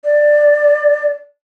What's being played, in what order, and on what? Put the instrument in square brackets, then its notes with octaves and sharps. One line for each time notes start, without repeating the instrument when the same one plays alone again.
[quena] D5